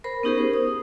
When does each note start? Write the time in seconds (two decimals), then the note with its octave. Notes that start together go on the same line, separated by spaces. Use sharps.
0.04 A#4 C5 B5
0.23 B3 C#4 D#4 G4 G#4 A#4
0.35 G4 C5
0.54 D#6